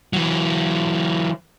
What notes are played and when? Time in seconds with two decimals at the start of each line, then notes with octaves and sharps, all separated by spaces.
0.13 E3 F#3